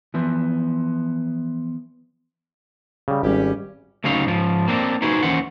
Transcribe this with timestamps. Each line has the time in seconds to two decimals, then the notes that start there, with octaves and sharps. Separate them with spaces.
0.14 E3 F3 B3
3.08 C#3 G3
3.23 G#1 G3 C#4 G4
4.04 D2 C#3 F#3 D#4 F5
4.26 G#2 F3
4.68 A#3 C4 D4
5.02 D#4 E4 F#4 G#4 B4 C5
5.23 D#2 E3 C#4 C5 F#5